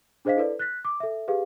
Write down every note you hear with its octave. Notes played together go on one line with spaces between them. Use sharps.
D4 G#4 C5 D#5 F5 B6
E4 A4 B4 D5
F#6 A6 B6
D6
A4 E5
G4 G#4 B4 F5